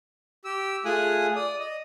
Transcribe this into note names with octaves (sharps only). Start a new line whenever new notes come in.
G4 E6
A3 F4 G#4 G#5 D#6 F#6
D5 D#6
D#5